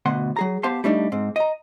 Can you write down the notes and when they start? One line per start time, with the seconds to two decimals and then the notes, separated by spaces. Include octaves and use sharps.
0.06 D2 B2 F#5 C6
0.36 F#3 G#4 A#5
0.63 B3 G4 C5 F5 A5 C6
0.84 G3 A3 D4 D#4
1.12 G#2 C4
1.36 D#5 A#5